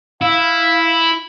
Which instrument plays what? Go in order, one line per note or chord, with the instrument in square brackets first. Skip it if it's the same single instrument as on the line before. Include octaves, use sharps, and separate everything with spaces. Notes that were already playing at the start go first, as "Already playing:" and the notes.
[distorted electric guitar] E4 [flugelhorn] F5